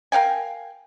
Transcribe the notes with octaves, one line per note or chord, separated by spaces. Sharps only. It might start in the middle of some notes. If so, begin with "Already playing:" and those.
A#4 F5 G5 G#5